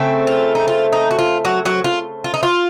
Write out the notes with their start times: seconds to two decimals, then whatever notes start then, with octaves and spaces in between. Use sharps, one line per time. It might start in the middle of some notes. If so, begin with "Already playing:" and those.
Already playing: C#3 A3 C4
0.27 F4
0.55 D#4
0.68 F4
0.92 D#4
1.11 F#4
1.19 F4
1.45 F#3 F#4
1.65 F#3 F#4
1.84 F4
2.24 F4
2.34 D#4
2.43 F4